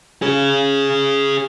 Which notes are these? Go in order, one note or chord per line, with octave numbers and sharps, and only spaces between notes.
G#4 C#5